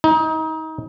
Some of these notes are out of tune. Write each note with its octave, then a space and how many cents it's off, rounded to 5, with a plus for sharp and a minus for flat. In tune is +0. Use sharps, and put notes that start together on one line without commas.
D#4 +30